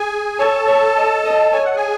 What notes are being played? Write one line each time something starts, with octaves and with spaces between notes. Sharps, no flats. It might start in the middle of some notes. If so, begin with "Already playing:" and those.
Already playing: G#4 G#5
A4 C#5 A5
C#5
D#5
D#5
C#5 G#5
F#5
G#4 G#5